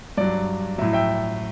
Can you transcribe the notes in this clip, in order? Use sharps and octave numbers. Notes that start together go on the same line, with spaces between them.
G2 F#3 D5
A2 F#3 E5
E5 G5